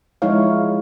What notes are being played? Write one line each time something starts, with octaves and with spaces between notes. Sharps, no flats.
F3 G#3 D#4 E4 C#5 F5